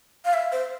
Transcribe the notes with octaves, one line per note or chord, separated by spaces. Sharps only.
F5
E5
C5